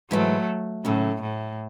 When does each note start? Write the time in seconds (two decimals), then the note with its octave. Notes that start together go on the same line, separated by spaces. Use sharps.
0.11 G#2 E3 F#3 G#3 A3
0.85 D#2 A2 C#3 F#3 A3
1.22 A2